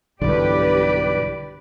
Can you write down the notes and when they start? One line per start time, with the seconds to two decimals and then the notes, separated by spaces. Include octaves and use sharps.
0.22 B1 G2 D3 E3 G4 B4 D5